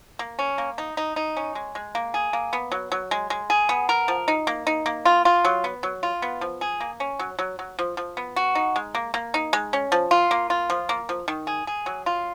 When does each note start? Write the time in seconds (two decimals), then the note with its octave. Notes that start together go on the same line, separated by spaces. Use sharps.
0.19 A#3
0.39 C#4
0.58 A#3
0.78 D#4
0.97 D#4
1.16 D#4
1.37 C#4
1.55 G#3
1.75 G#3
1.95 A#3
2.14 G#4
2.33 A#3
2.53 B3
2.72 F#3
2.92 F#3
3.11 G#3
3.30 G#3
3.50 G#4
3.69 B3
3.89 A#4
4.08 F3
4.28 D#4
4.47 A#3
4.67 D#4
4.86 A#3
5.05 F4
5.25 F4
5.45 F#3
5.64 B3
5.83 F#3
6.03 F4
6.22 B3
6.41 F3
6.61 G#4
6.80 A#3
7.00 C#4
7.19 F#3
7.39 F#3
7.59 F#3
7.79 F3
7.97 F3
8.17 B3
8.36 F#4
8.55 D#4
8.76 G#3
8.95 A#3
9.14 A#3
9.34 D#4
9.53 G#3
9.73 C#4
9.92 F3
10.11 F4
10.31 A#3
10.50 F4
10.70 F3
10.89 A#3
11.09 F3
11.28 D#3
11.47 G#4
11.67 G#4
11.86 F#3
12.06 F4